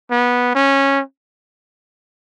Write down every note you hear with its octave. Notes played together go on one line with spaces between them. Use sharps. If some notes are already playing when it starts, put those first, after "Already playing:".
B3
C#4